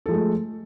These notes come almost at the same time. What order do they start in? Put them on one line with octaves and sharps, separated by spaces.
A4 F3 G#3 A3